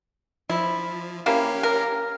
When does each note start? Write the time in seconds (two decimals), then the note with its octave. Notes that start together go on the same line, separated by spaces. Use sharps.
0.49 F3 E4
1.26 A#3 C#4 E4 G4 F5
1.63 A#4